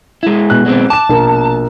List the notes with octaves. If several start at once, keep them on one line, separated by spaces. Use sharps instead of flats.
G#3 E4
B2 F#6
F#3 G#3 C4
A5 D6 E7
A#1 B2 A#4